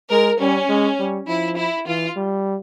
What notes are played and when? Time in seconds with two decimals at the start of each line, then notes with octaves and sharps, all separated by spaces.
0.10 G#3 A#4
0.40 G3 C#4
0.69 G#3
0.99 G3
1.28 F3 E4
1.58 E4
1.87 E3 F4
2.16 G3